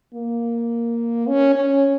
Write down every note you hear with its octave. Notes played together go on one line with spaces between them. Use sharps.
A#3
C#4
C#4